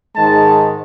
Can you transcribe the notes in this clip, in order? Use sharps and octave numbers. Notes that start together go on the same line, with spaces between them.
G#2 D#3 G#3 A5